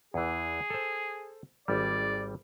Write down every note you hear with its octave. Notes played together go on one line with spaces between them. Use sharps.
E2 E3 G#4
A4 C5
G#1 G3 D5